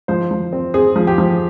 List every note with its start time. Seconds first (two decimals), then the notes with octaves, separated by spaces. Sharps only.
0.08 F3 C5
0.31 F3
0.53 C4
0.74 C4 G#4
0.96 F3
1.07 G4
1.18 F3